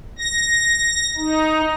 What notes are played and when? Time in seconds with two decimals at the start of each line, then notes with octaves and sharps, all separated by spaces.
0.19 A#6
1.17 D#4